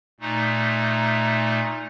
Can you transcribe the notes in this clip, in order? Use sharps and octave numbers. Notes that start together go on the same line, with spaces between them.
A#2 A3 D#4